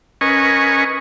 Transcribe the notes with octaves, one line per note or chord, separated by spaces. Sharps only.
C#4 A#4 B4 D#5 G#5 C#6